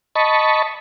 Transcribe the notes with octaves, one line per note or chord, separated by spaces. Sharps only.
D#5 A5 B5 C#6